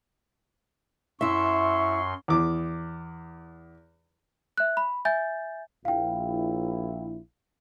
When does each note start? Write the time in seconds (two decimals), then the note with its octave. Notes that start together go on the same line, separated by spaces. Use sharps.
1.21 F#2 E4 E5 C6 C#6
2.28 E2 D6
4.57 E5 F#6
4.77 B5
5.05 E5 G#5 G6 A6
5.85 A#1 E4 F5 G5